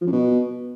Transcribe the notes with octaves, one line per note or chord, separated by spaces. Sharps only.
F3
F#2
B2